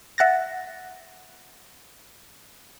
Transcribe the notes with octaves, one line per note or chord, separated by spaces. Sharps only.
E5 F#5 F#6 A6 A#6